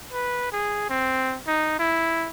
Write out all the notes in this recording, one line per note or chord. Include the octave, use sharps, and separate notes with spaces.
B4
G#4
C4
D#4
E4